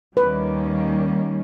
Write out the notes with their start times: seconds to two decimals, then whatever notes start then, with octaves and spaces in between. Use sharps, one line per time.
0.17 D#2 D#3 G3 A#3 C#4 B4